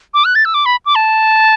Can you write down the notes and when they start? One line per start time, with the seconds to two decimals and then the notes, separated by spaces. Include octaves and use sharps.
0.14 D6
0.25 F#6
0.35 A6
0.45 E6
0.54 D6
0.66 B5
0.86 D6
0.95 A5